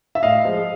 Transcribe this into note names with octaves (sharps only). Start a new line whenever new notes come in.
E5
A2 D#5 F5
F3 G#3